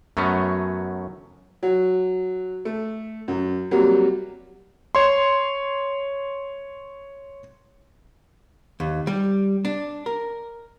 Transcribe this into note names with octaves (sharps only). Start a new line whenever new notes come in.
F#2 F#3 A3 B3 C#4
F#3
A3
F#2
C3 F#3 G3 A#3
C#5 C6
D#2
G3
D4
A#4